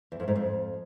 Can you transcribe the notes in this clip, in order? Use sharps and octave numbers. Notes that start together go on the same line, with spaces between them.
E2
F2
G#2
F2